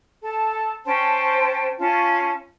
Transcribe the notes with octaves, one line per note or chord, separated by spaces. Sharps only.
A4 A5
C#4 C5 G5 A5
C#4 F4 A5